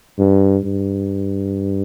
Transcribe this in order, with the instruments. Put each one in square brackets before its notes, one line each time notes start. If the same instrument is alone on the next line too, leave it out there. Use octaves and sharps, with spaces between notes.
[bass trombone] G2
G2